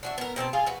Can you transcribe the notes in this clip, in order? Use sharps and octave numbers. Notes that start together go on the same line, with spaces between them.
D4 F#4 E5
B3 A#4
B2 C4 A4 A5
F4 G#4 F5
F#4 B4